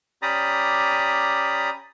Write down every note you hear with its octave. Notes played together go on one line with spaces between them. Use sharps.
C#4 G4 D5 A#5 B5 D#6